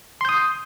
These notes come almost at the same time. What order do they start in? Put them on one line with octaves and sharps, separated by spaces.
C6 G6 D#6